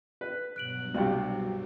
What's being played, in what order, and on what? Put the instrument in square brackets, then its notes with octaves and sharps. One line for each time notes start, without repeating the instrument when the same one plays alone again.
[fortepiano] B4
[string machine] G2 B2 F#3 [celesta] F#6 D7 F#7
[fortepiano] C2 C3 [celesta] F#4 F5 G5